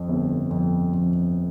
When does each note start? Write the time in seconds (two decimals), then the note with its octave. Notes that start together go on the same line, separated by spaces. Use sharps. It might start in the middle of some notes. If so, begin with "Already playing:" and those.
Already playing: F2
0.09 G1
0.51 F2
0.93 F2